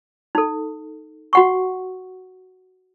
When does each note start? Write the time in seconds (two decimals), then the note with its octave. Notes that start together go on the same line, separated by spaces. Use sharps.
0.35 D#4 A4
1.33 F#4 F#5 C#6